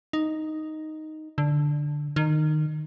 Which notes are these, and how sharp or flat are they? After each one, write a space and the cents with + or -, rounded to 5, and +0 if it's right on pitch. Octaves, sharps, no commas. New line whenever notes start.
D#4 +0
D3 +5
D#3 -20